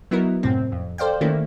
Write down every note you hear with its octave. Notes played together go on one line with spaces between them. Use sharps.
F#3 B3 D#4 E4 A#4
F#2 A2 C3 C4
F2
A4 C5 D5 F5 G5
D#3 A3 A#3 C#4 E4